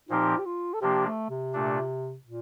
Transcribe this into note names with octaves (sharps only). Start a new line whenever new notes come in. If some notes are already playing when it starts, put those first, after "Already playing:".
A#2 F3 C4 D#4 G4 A#4
G4
F4
A4
C3 F3 A#3 D4 G4
A3
C3
A#2 A3 D4
A#2